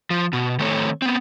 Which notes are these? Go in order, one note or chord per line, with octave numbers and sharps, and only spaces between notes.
F3
B2
D#3 A3 C4 A4 C#5
B3 C4